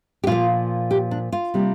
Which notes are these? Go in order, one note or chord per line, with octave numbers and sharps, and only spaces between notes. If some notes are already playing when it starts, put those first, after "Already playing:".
G4
A#2 F3 A#3 F4
G4
D4
F4
C3 G3 A#3